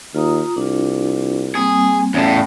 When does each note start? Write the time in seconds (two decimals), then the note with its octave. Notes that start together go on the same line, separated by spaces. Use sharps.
0.15 D#2 F4 A#5 D#6
0.57 C2 D4 F4
1.55 G3 A#3 C4 G#4
2.14 E2 A2 C#4 D5 F5